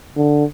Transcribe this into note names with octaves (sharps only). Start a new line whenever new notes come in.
D3